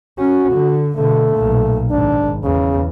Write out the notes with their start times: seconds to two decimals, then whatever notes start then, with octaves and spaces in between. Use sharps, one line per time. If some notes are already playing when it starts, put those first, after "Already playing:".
0.19 C#4 F#4
0.52 D3
0.96 B2 D3 A3
1.34 B1 A#2
1.91 G#1 D4
2.44 E2 C#3